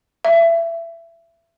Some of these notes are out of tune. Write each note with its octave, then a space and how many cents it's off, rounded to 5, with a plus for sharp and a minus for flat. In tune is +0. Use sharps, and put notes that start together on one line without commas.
E5 +25